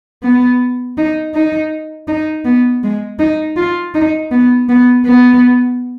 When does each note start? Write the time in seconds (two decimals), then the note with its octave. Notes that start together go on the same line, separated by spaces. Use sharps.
0.23 B3
0.98 D#4
1.35 D#4
2.08 D#4
2.45 B3
2.83 G#3
3.19 D#4
3.57 F4
3.95 D#4
4.32 B3
4.69 B3
5.05 B3